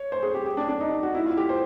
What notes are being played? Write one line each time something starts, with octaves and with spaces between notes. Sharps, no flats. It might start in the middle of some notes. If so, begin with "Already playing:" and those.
Already playing: C#5
C5
G#4
G4
G4
D4
D4
D#4
F#4
E4
F4
G4
C5